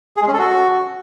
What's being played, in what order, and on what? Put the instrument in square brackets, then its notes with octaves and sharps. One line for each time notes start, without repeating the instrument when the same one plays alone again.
[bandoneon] G#4
G#3
C#4
A4
F#4